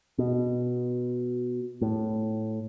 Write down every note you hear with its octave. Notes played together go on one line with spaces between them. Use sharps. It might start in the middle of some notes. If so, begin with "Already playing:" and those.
B2
A2